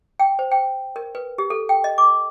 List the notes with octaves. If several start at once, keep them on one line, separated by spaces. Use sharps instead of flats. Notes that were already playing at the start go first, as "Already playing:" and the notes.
G5
C5
G5
A#4
B4
G4
A4
G5
D#5
D6